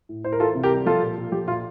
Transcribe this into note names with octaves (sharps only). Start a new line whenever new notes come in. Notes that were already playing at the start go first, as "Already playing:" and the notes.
A2
A2 C5
A#4
E3 F4 A4
C3
G4 A#4
G3
F3 F4 A4
A#2
A#2
F3 G4
A#2 F4